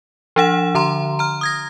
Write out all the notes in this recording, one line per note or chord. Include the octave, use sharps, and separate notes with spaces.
F3 D4 F#5 E7
D3 A#5 C6
A#5 F6
D#6 G#6 A#6